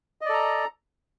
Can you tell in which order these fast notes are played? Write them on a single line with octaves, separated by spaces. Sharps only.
D#5 D5 A4 A#5